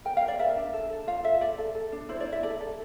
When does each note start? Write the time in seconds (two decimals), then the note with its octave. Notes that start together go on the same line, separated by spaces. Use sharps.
0.05 A#4 G5
0.17 F5
0.22 A#4
0.28 D5
0.39 A#4 E5
0.57 D4
0.73 A4
0.90 A4
1.07 F4 F5
1.24 A4 E5
1.41 A4 D5
1.58 A4
1.75 A4
1.92 D4
2.09 E4 C5
2.20 D5
2.26 E4
2.32 E5
2.43 A4 D5
2.61 A4